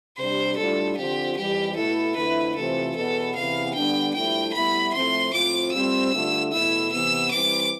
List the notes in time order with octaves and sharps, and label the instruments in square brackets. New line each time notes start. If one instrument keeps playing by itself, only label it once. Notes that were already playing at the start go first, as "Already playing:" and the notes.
[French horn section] C3 G3 D4 [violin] C5
[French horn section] A2 G3 D4 F4 [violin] A4
[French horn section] D3 F3 C4 F4 [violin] G4
[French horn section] F2 E3 G3 [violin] G4
[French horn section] B2 A3 E4 [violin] A4
[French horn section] F2 D3 A3 E4 [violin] B4
[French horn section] C3 E3 A3 C4 F4 [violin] A4
[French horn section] E2 B2 B3 [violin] A4
[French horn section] E2 C3 E3 B3 [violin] F5
[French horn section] D3 G3 B3 D4 [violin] G5
[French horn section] G2 F3 A3 E4 [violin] G5
[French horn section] A2 G3 B3 E4 [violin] B5
[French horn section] A2 F3 A3 C4 E4 [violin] C6
[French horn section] A2 F3 C4 F4 [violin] D6
[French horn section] A2 G3 C4 F4 [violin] E6
[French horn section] G2 D3 A3 D4 F4
[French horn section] E2 B2 A3 E4 [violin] E6
[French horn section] C3 E3 B3 [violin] E6
[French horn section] E3 G3 C4 E4 [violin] D6